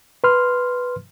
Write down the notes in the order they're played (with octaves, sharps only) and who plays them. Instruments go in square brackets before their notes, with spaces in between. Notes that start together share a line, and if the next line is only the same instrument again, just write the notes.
[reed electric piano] B4 C6 F6